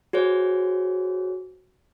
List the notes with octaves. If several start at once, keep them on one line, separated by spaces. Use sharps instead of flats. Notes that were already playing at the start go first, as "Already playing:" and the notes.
F#4 G#4 C5 C#5